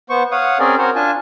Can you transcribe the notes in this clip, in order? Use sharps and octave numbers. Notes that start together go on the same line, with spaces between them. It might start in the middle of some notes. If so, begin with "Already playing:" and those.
B3 C5 C#6
C#5 F5 F#5 D#6
C4 C#4 G#4 A#4 D5
F#4 A#4 C5 C#5
D4 F4 G#5 A5